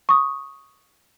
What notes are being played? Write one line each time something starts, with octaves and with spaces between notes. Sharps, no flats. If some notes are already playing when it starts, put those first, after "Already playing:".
C#6 D#6